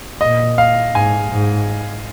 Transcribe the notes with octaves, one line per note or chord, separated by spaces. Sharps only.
A#2 D#5
F5
G#2 G#5
G#2